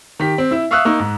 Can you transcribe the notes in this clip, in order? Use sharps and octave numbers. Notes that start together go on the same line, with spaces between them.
D#3 G4 B6
C4
E4 E5
E5 F5 C#6 D#6 E6 F#6
A#3 D#4 C#6 E6
G#2